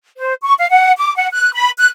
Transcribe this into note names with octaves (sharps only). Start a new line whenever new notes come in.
C5
C#6
F5
F#5
D6
F#5
F#6
B5
F#6